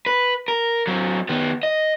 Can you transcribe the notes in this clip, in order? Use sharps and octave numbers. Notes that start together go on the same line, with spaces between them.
B4
A#4
F#3 C4
D#3 B3
D#5